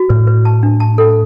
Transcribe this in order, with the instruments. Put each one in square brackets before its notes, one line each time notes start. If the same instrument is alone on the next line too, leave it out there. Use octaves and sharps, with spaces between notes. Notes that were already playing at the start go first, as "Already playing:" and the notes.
Already playing: [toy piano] F#4
[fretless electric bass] A2 [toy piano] B4
[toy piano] B4
A5
D4
A5
A4